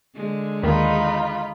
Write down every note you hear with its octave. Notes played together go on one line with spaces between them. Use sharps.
D3 G#3
D#2 D#3 A#3 D#4 F4 B5